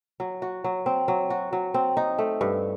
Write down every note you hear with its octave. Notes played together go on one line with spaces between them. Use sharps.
F#3
F#4
F#3
C4
F#3
F#4
F#3
C4
D#4
A3
G2